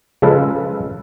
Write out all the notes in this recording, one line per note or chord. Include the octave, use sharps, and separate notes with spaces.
C#3 F3 G#3 A4 B4 F5